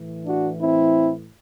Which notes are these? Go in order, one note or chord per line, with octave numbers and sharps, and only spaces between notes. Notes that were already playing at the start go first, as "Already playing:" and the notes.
Already playing: A2 E3
D4 F#4
C4 E4